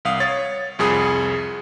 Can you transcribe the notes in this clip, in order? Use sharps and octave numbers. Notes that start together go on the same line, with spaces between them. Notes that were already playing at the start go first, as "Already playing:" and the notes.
C2 F5 D#6
C#5 A6
C2 F2 G#4 D#6